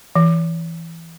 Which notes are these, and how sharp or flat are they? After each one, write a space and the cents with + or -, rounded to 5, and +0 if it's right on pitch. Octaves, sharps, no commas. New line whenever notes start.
E3 +5